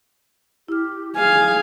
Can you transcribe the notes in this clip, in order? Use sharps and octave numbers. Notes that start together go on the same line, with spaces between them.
E4 G4 F6
G#4 F5 G#5